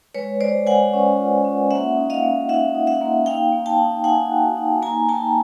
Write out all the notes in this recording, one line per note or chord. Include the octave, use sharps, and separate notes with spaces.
G#3 B4 C#5
G#3 C5 D5
G#3 F#5 G#5
C#4
F4
C#4
A#3 E5 F#5
D#4
D#5 F5
A#3
D#4 E5 F#5
D#4
E5 F#5
A#3
D#4 F5 G5
A#3
G5 A5
D#4
D#4 F#5 G#5
F#4
D#4
A#3 G#5 A#5
A#3 G5 A5